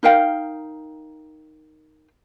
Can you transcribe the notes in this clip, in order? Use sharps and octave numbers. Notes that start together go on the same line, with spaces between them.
D#4 A#4 F5 G5